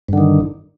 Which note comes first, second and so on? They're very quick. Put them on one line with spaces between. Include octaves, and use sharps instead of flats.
G2 D3 D#3